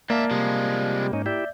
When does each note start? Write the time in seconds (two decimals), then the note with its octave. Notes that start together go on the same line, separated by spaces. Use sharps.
0.10 G#2 A#3 D5 E5 F5 A5
0.31 C3 F3 G3 G#3
1.13 G#2 C#4 D#4
1.26 E4 G4 D5 E5 G6